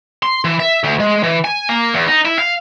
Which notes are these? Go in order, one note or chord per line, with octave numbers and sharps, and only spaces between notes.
C6
E3
E5
D2
G#3
E3
G#5
A#3
E2
D#4
E4
F5